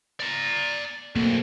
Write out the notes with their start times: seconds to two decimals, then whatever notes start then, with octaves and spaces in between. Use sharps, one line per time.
0.20 D5 A#5
1.16 B1 A3 A#3 C4